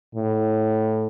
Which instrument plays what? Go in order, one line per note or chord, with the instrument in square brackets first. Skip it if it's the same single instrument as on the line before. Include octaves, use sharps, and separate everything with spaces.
[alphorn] A2